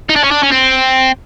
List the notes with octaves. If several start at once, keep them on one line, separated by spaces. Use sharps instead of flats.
D#4
D4
C#4
D4
C#4
C4